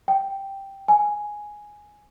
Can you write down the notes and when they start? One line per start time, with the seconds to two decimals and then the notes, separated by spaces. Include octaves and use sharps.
0.08 G5
0.88 G#5